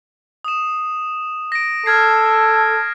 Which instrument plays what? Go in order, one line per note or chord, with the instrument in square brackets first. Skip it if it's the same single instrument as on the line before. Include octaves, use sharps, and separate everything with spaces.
[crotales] D#6 E7
A#6 D7
[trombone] A4 [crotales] F6 G#6 C7